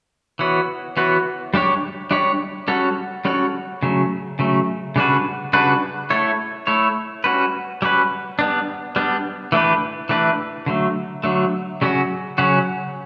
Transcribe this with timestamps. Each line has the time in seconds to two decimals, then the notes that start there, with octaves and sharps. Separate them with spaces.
0.39 E3 B3 F#4 C#5
0.97 E3 B3 F#4 C#5
1.54 G3 D4 G4 C#5
2.11 G3 D4 G4 C#5
2.68 G3 C#4 F#4 A4 C#5
3.25 G3 C#4 F#4 A4 C#5
3.83 C#3 F#3 A3
4.39 C#3 F#3 A3
4.96 C#3 G3 D4 F#4 B4
5.53 C#3 G3 D4 F#4 B4
6.10 A3 E4 A4 C#5
6.67 A3 E4 A4 C#5
7.24 G3 C#4 F#4 B4
7.82 G3 C#4 F#4 B4
8.39 G3 B3 D4
8.96 G3 B3 D4
9.52 E3 A3 D4 G4 B4
10.09 E3 A3 D4 G4 B4
10.66 D3 F#3 A3
11.24 D3 F#3 A3
11.82 C#3 F#3 C#4 F#4
12.38 C#3 F#3 C#4 F#4